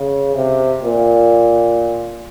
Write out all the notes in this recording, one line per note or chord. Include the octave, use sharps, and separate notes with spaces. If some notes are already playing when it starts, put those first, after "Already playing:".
Already playing: C#3
C3
A#2